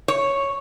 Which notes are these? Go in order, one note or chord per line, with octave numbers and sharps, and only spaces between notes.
C#5